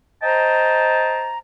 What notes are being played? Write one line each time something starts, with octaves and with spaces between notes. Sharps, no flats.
C5 D#5 G5 A5 A#5